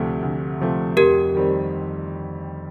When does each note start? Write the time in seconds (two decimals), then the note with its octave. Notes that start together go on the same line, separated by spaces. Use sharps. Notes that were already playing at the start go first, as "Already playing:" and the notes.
Already playing: D2 C3 F3 A3
0.22 D2
0.60 C3 F3 A3
0.97 F2 G4 A#4
1.35 D#3 G3 C4